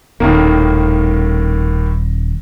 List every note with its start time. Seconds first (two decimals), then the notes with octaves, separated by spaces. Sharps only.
0.20 D#1 A2 D#3 A#3